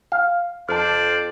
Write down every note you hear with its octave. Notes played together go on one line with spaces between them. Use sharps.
F5
F2 D4 C5 D5 A5 F6